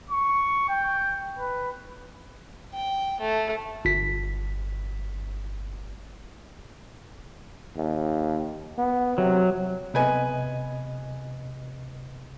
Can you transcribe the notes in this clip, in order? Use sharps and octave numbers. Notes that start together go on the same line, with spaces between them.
C#6
G5
B4
G5
A3
G1 B6
D#2
B3
C3 F#3
C3 B3 B4 D#5 G#5